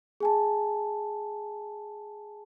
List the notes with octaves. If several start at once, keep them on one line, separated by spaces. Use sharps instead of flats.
G#4 G#5 A5